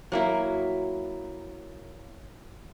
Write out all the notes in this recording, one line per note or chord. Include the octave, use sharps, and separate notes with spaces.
F#3 A#3 E4